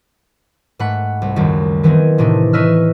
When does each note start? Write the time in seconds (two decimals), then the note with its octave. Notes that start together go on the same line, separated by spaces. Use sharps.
0.79 G#2 A3 F#5 B5
1.22 C2
1.36 C#2 F#2 D#3 G3
1.83 D#3 E3 B3 C4 G#4 D#5
2.18 A2 C3 E3 D4 D#4
2.53 B4 C#5 D#5 E5 E6 F6